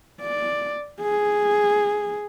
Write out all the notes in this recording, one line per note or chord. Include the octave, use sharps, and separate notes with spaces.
D5
G#4